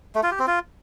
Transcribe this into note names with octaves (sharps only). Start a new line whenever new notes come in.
A3
F4
G4
C4
F4